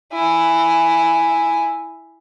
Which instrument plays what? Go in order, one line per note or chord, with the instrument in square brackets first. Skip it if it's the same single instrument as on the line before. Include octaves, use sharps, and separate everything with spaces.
[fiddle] E4 G#5